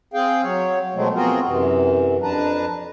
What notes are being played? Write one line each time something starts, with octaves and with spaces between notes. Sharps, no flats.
C4 G#4 F5 G5
F#3 C#5
B2 F3 F#3 G#3 A3 C4
B3 C4 F4 F#4 G#4 A#4
F#2 C3 E3
F2 D4 B4 A5 A#5